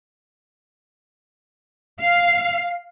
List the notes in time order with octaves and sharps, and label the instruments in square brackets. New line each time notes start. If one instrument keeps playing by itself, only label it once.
[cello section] F5